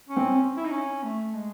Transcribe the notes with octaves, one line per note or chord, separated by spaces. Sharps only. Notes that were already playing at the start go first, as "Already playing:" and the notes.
C#4
C4
E4
D#4
C#4
A3
G#3